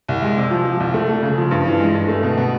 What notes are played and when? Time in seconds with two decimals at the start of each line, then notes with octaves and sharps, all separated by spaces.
0.09 C2
0.22 G#3
0.37 C3
0.51 F3
0.65 F3
0.80 C2
0.94 A3
1.09 A3
1.23 C#3
1.38 F3
1.51 G2
1.66 E3
1.80 G#3
1.94 G2
2.08 A3
2.23 B2
2.37 B2